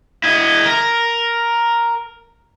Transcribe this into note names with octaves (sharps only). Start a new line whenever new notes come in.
E4 D#5
A#4